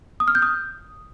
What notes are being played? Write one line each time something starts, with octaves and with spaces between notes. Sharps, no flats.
D#6
F6
G6
D#6